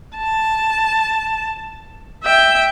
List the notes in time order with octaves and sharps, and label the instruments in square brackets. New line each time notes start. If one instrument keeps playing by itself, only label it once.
[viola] A5
E5 G5